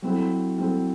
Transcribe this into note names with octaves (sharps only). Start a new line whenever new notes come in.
F#3 C4 E4 A4
F#3 C4 E4 A4